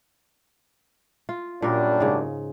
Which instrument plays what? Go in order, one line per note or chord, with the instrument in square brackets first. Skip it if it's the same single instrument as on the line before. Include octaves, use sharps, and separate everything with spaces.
[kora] F4
[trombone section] F#2 G3 D4 [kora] A#2 A#4
[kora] G#2 C#3